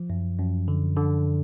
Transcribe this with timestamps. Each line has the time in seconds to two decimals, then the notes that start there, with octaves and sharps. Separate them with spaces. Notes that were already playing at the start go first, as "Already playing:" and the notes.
Already playing: F3
0.10 F#2
0.39 F#2
0.68 D3
0.96 D3